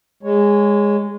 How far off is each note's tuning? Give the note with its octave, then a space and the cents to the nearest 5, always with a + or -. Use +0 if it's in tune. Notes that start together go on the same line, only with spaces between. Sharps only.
G#3 -15 C#5 +0